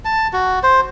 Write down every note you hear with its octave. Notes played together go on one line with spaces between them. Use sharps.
A5
F#4
C5